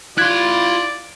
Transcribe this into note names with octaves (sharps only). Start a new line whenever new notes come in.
E4 F4 D5 C6 F#6 G#6